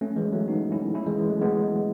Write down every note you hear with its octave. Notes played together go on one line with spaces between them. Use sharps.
A3 C#4
F#3
E3 G#3
F#3 A3
B3 D#4
C#4 E4
C#4 E4
E3 G#3
E3 G#3
F#3 A3
G#3 B3